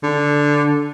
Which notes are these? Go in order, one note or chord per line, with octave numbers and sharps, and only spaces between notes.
D3